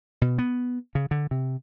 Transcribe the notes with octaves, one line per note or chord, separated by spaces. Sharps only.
B2
B3
C#3
D3
C3